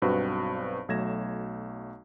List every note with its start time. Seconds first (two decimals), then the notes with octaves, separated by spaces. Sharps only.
0.02 B1 G2 C4 F#4 B4 C5
0.89 B1 F#3 A3 G#6 A#6 E7